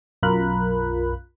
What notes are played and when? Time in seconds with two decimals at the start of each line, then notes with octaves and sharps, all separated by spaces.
0.23 B1 F#2 F4 A#4 B5 F#6